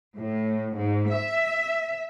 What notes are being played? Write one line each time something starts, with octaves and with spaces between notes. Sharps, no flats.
A2
G#2
E5